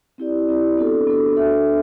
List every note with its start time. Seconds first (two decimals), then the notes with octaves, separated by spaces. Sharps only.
0.18 C4 E4 G4 D5
0.48 C4 E4 G4 D5
0.78 B3 D4 F#4 A4
1.07 B3 D4 F#4 A4
1.37 D4 A4 E5
1.66 D4